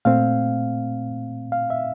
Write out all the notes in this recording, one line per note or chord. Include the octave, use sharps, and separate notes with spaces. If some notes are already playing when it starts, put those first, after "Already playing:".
A#2 A3 C4 F5
F5
E5